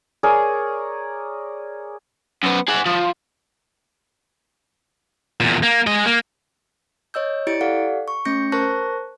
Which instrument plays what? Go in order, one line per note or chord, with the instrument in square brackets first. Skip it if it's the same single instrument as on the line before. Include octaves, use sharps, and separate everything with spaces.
[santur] G#4 A#4 C#5 D5
[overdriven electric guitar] F#2 B3
G#4 F#5
F3
[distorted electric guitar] E2 A#2
A#3
G#3 D#5
A#3
[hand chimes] C#5 D#5 E6 G6
E4 G4 D5 A6 C#7 D7
G4 A4 D5 F5 F#5
C#6
A3 C#4 G6 A#6 C#7
A#4 C5 A5 C#6 F#6 A#6